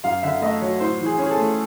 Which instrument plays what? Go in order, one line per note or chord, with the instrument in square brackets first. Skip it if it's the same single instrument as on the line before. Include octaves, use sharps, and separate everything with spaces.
[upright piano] F#2 F5
D3 E5
A3 D#5
F#3 C#5
A2 C5
E3
G#4
C#4
G#4
A4
A3